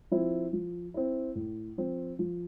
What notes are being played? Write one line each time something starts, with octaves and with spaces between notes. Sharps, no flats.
F3 C4 E4
F3
C4 E4
A2
F3 C4
F3